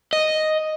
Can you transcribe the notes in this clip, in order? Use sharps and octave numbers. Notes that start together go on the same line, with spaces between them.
D#5